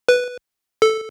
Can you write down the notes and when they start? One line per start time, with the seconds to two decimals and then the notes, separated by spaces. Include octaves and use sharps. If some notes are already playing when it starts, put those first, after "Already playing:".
0.09 B4
0.82 A4